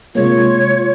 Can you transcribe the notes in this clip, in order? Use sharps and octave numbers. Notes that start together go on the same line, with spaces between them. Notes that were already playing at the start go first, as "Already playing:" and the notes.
C3 G#3 A#3 F4 C#5